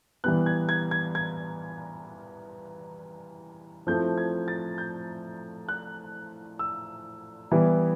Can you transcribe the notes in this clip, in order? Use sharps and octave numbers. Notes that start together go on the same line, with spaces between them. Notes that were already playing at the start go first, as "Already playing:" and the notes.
E3 G3 B3 F#6
G#6
G#6
G#6
G#6
F3 A3 C4 E4 G6
G#6
A6
G6
F#6
E6
E3 G3 B3 E4